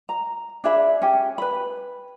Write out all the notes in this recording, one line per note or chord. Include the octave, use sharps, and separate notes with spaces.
A#5
D4 G#4 E5 B5
C#4 G4
B4 B5